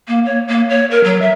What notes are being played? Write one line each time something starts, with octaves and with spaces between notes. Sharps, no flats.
A#3
C#5
A#3
C#5
A#4
F#3
E5